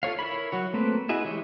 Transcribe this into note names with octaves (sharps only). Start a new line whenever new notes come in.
F4 A4 C#5 F5
E4 A#4 C#5 B5
F#3 F#4 C#5
A3 A#3 C4 B4
E4 F#4 G#4 D#5 E5
E3 G#3 G4 C#5